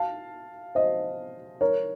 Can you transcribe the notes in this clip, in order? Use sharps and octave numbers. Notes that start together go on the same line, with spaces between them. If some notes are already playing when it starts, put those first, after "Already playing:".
Already playing: F5 A5
C5 D#5
A#4 C#5